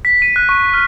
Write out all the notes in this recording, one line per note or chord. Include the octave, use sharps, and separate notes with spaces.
B6
D#7
F#6
C#6
F6